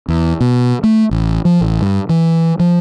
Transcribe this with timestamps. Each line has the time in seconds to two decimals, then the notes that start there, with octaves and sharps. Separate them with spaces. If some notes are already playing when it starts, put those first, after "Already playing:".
0.08 E2
0.41 B2
0.84 A3
1.11 A1
1.45 F3
1.61 A1
1.81 G2
2.09 E3
2.60 F3